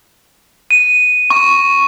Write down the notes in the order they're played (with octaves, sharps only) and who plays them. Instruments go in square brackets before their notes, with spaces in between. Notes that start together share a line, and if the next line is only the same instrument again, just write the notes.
[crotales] D#7
C#6